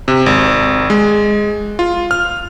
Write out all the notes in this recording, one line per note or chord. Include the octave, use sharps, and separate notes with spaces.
C3
G#1
G#3
F4
F6